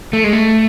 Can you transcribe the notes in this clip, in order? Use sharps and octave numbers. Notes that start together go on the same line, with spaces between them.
A3
G#3
A3